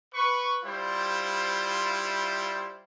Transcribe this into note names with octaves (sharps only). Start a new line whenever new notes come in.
B4 C#6
G3 E4 F4 C5